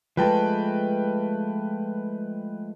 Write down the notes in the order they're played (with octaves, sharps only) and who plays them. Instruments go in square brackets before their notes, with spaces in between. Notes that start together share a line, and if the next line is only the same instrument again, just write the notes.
[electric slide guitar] F3 G#3 A3 [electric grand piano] B4 G5 A5